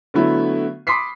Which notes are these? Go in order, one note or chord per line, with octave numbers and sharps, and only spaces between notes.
D3 F#3 A3 B3 E4
B5 C6 D6 D#6 B6 C7